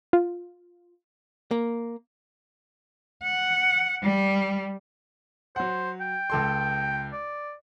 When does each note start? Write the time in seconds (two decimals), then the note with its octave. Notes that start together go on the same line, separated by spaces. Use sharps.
0.13 F4
1.51 A#3
3.23 F#5
4.03 G3
5.56 F#3 C5 F#5
6.01 G5
6.30 C#2 A4 C6
7.13 D5